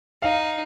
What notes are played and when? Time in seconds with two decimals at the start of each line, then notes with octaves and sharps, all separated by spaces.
0.22 D#4 F5